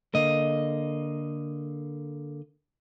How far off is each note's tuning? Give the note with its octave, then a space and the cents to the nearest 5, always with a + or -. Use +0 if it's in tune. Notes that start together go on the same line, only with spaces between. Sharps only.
D3 +0 A#3 +0 D#5 +0